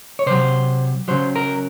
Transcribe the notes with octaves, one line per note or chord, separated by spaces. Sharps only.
C#5
C3 F#3 C5
C#3 F#3 C5
A#4